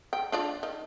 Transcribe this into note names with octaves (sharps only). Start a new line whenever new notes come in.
G5
D4 F4 D5
D#3